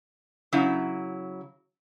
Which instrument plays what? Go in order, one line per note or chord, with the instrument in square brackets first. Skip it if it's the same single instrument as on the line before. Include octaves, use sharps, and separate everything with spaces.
[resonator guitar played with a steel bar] C#3 F#3 E4